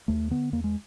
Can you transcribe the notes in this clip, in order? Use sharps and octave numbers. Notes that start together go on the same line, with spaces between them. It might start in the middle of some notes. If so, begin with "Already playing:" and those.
D#2 A3
D3 B3
E2 A#3
G#3